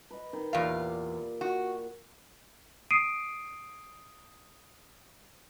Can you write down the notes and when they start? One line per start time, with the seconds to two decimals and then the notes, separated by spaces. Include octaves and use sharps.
0.10 B4 D#5
0.33 D#3 D#5 G5
0.53 E2 A#2 G4 D5 F5
1.41 F#4
2.91 D#6 C7 D7 D#7